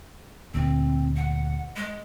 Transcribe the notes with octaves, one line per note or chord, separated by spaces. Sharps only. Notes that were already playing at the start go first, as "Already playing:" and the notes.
D2 A#2 C4
F#5
G#3